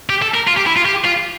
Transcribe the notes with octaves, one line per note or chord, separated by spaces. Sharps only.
G4
A4
A#4
F4
G4
E4
F4
G4
F4